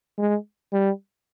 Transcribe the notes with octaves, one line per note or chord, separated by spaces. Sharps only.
G#3
G3